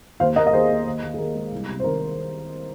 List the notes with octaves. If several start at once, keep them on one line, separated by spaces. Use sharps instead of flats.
D#2 C5 F5
D#2 A#4 D#5
D#5
D#2 G#4 C5
A#3
D#2
D#2
G#4
D#2 A#4
G#3
C2
C3
C5
D#3 A#4